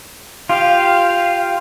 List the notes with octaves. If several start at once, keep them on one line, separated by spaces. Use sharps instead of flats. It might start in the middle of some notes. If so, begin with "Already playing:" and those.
F4 G4 F5